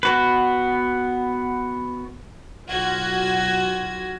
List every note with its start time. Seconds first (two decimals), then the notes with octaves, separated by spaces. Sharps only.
0.03 B3 F#4 B4
2.69 B1 F4 F#4 G#6